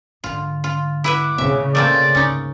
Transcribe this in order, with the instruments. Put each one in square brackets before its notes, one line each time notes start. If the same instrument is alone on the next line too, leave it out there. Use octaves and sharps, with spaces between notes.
[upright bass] G#2 D3 [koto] F4
[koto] F4
[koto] E4 B4 E5 [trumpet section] F#5 D6
[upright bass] D#2 A2 [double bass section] C#3 [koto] E5
[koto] A3 A#3 C4 [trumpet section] D5
[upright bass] D2 G#2 [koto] C#4 D#4